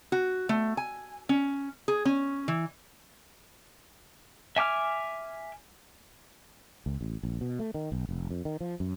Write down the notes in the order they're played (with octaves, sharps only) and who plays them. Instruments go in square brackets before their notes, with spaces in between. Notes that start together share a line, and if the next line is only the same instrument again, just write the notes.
[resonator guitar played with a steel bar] F#4
A3
G#5
C#4
G#4
C#4
E3
[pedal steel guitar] E5 G#5 D6 F6
[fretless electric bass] C#2
A1
A#1
B2
A3
D#3
B1
F1
F2
D#3
F3
F#2